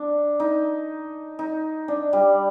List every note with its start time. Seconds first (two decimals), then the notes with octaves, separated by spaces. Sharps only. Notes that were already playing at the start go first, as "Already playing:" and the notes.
Already playing: D4
0.40 D#4
1.39 D#4
1.88 D4
2.13 G3